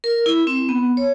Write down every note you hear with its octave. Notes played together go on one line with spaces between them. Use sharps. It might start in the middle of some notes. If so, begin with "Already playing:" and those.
A#4
E4
C4
B3
C#5